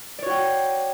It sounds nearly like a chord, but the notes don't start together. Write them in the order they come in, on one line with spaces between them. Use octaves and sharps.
D5 C#5 F#4 G5